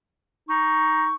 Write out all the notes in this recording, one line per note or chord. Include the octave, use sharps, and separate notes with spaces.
D#4 C#6